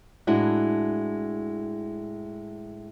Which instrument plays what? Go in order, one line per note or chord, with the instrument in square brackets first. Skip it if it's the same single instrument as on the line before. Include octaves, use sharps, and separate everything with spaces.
[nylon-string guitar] A2 G#3 D4 E4 F#4